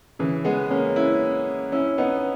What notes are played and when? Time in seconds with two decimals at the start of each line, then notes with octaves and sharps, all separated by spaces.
0.19 C#3 E3
0.44 G#3 B3
0.70 A#3 C#4
0.96 C#4 E4
1.72 C#4 E4
1.98 B3 D#4